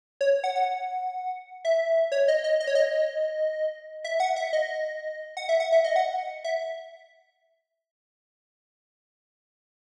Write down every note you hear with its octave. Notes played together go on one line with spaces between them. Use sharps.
C#5
F#5
F#5
E5
C#5
D#5
D#5
D#5
C#5
D#5
E5
F#5
E5
D#5
F#5
E5
F#5
E5
D#5
F#5
E5